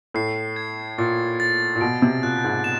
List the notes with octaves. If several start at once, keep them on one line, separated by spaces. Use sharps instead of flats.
A2 C7
G#6
A#2 A6
A6
A#2
B2 D7
C3
A#2 F#6
G#2
E7